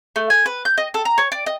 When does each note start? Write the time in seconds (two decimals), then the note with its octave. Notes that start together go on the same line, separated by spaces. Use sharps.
0.16 A3
0.30 G#5
0.46 B4
0.65 G6
0.78 D#5
0.94 A4
1.05 A#5
1.18 C#5
1.32 D5
1.46 D#5